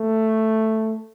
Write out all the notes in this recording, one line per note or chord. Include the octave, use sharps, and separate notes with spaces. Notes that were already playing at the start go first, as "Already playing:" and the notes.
Already playing: A3